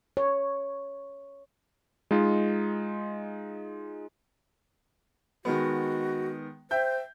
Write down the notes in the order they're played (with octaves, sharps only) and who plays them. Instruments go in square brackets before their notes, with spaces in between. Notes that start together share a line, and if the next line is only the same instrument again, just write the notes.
[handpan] C#5
[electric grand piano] G#3 D#4 F4
[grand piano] D#3 G#3 B3 [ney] F#4
[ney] C5 [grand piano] E5 G5 G6